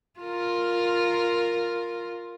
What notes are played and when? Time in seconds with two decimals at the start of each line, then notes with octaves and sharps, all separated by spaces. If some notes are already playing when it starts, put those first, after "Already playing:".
0.20 F4 A#4